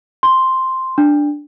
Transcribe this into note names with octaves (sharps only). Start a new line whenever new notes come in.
C6
D4